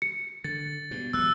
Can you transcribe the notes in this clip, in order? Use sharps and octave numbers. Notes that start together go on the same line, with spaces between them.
C#7
D3 A6
G2 B2
E1 B1 G3 E6 F#6